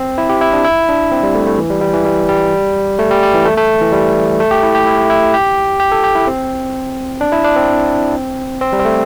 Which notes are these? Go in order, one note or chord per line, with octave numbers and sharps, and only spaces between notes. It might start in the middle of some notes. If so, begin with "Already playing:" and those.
Already playing: C4
E4
G4
E4
D4
E4
D4
C4
G3
A3
A3
E3
G3
G3
E3
G3
G3
A3
G3
G3
E3
A3
A3
E3
G3
A3
G4
E4
G4
E4
E4
G4
G4
A4
G4
E4
C4
D4
E4
D4
C4
C4
G3
C4
A3